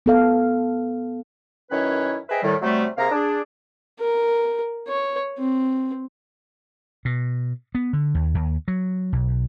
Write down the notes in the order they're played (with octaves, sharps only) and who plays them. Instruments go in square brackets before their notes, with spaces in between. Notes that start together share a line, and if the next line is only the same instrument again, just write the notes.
[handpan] B3 A4 F5
[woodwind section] F#2 D#3 C#4 E4 B4 C#5
G#4 B4 C5 D#5 E5 G5
A2 D#3 G3
C3 F#3 G3 A3
C3 A#3 G#4 A#4 F5 A#5
D4 G#4
[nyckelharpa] A#4
C#5
C4
[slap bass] B2
B3
D3
D#2
D#2
F#3
B1